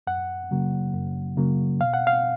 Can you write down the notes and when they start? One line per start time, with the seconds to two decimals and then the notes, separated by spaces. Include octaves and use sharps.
0.07 F#2 F#5
0.51 C#3 F#3 A#3
0.93 F#2
1.37 C#3 F#3 A#3
1.81 B2 F5
1.94 F#5
2.07 F5